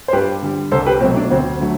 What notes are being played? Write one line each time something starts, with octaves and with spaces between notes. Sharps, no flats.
C5
G2 G4 B4
D3 G3
C2 A4 C5
G4 B4
B2 F#3 A3 C4
D4
D2 C4
D3 F#3 A3